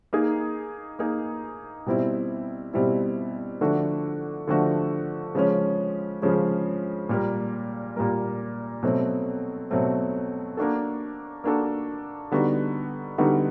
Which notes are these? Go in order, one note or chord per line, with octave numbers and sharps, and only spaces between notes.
A#3 D#4 G#4
A#3 D#4 G#4
B2 G3 C4 E4
B2 G3 C4 E4
D3 F3 A3 D4 F#4
D3 F3 A3 D4 F#4
C#3 F3 G#3 C#4
C#3 F3 G#3 C#4
A#2 G3 A#3
A#2 G3 A#3
B2 F#3 A3 C4
B2 F#3 A3 C4
A#3 D4 F#4 A4
A#3 D4 F#4 A4
D3 G3 B3 D#4 F#4
D3 G3 B3 D#4 F#4